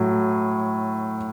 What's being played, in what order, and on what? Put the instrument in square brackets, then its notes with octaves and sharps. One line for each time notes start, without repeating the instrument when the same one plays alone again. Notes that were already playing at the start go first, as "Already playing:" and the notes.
Already playing: [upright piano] A2 F#3